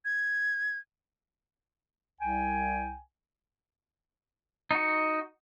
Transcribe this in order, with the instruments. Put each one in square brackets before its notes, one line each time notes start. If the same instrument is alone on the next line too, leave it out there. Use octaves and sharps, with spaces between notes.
[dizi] G#6
[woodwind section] C2 G5 G#5
[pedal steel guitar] D#4 F#4